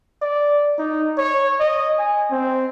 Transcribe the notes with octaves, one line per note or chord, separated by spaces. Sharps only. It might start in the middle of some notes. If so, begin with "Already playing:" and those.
D5
D#4
C#5
D#5
G#5
C4